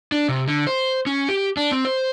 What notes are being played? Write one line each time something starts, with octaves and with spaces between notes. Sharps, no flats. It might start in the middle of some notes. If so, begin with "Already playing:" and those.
D4
C3
D3
C5
C#4
G4
D4
C4
C5